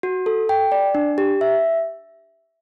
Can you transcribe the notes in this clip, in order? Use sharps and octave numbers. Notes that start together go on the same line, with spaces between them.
F#4
A4
G5
D5
D4
G4
E5